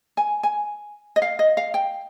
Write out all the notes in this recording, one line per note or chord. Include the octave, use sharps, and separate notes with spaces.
G#5
G#5
D#5
F5
D#5
F5
G5